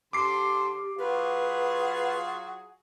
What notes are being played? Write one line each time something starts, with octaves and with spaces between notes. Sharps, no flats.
D3 G4 C5 D6 C7
F#3 F4 G#4 B4 F#5